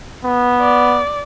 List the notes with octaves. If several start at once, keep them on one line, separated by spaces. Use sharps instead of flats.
B3
D5